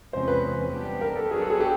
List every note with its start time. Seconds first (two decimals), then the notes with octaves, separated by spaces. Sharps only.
0.13 E2 C3 F3 G#3 C#4 C5
0.28 B4
0.72 G3 B3 D4 G4
1.01 A#4
1.16 A4
1.30 F#3 B3 D4 G#4
1.41 A4
1.50 G#4
1.60 G4